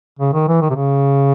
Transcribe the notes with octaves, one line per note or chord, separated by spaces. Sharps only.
C#3
D#3
E3
D#3
C3
C#3